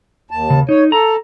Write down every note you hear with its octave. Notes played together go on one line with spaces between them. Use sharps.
D#2 A5
C#3
D#4 C#5
A4 A#5